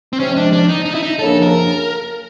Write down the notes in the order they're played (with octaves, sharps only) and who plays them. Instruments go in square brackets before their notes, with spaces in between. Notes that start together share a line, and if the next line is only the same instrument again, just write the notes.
[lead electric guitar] C4
[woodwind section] C3 F3 G#3 [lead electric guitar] C#4
[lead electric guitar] D4
D4
D#4
D#4
E4
D#4
[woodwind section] F#2 C#3 F3 A#3 D4 [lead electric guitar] A4
[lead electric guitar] A#4